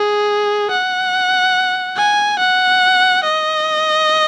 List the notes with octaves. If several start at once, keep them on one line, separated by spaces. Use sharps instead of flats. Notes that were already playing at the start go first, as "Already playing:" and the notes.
Already playing: G#4
F#5
G#5
F#5
D#5